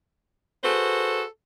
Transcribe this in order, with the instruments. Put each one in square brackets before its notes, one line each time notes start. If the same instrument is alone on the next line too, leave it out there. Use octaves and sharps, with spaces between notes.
[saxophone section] F#4 G#4 A4 B4 C5